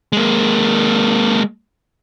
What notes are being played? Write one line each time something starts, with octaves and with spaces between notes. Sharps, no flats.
G#3 A#3